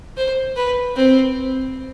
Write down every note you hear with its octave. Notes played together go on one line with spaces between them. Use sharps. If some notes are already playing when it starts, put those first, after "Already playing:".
C5
B4
C4